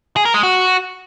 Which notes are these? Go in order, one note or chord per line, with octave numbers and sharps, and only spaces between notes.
G#4
A#4
G#3
F#4